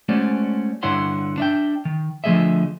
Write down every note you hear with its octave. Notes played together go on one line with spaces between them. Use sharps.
G#3 A3 C#4 F#4 C5 D5
G2 D3 E4 C#5 F#5 C6
D4 E5 G5
D#3
D3 F3 A3 G#4 D#5 E5